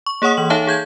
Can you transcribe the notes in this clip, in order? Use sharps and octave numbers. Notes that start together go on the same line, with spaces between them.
C#6
A#3 G#4 C#5 F#5 D#6
E3 F#7
D#4 A4 C#5 E5 F5 A5
G#4 G6 G#6